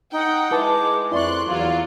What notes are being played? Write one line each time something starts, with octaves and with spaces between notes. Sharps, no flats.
D#4 F#5 G5
G#3 E4 B4 A5 D6
F2 E4 D5 C6 C#6 F#6
E2 F#3 F4 F5